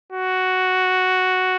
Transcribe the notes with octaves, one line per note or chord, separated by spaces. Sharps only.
F#4